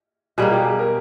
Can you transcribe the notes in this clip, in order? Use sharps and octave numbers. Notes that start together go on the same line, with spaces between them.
B2 G3 A#3 G#4
G4
G#4
A#4